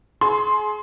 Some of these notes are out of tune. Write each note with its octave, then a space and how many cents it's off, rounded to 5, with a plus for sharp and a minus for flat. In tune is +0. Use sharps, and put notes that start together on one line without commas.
G#4 +30 C6 +0